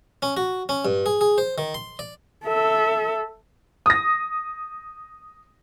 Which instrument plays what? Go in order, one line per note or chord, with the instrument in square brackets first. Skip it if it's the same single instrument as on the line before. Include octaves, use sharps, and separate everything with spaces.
[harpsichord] C#4
F#4
C#4
G2
G#4
G#4
C5
D#3
C6
D5
[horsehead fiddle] A4 E5
[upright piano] D#6 A#6